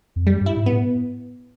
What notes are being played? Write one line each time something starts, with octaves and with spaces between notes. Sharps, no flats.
F2
F#2 G3
G2
E4
G#2
B3
A2